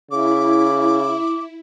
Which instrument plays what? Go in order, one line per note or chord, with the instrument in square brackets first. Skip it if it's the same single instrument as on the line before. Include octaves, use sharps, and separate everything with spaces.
[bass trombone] C#3 [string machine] E4 [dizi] D6